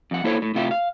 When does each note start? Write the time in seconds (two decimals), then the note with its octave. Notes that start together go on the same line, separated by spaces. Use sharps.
0.11 F2 F#5
0.24 A#3 E4 A4 C5 C#5
0.42 A2
0.54 A2 C3 F4 G4 E5
0.71 F5